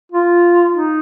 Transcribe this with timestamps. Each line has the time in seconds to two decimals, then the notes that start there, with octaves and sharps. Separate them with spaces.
0.12 F4
0.73 D#4